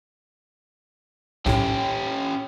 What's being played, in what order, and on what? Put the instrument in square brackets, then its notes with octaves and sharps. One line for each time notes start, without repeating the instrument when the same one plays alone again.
[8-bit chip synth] B1 A2 [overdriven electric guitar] C#4 G4